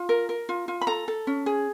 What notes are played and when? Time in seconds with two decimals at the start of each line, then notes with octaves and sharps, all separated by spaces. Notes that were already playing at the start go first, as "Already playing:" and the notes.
Already playing: F4
0.09 A#4
0.29 A#4
0.49 F4
0.68 F4
0.81 B5
0.87 A4 A#5
1.08 A4
1.27 C#4
1.46 G#4